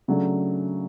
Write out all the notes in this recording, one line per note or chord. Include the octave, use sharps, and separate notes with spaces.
C#3 F#3 A3 D4